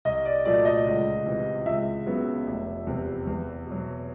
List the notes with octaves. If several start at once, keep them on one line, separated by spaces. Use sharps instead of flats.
C2 D#5
D5
A#2 F#3 A3 D5
D#5
C#2
C3 E3
C#2 E5
C#3 F#3 B3
F1
E2 C3
E2
B2
F#3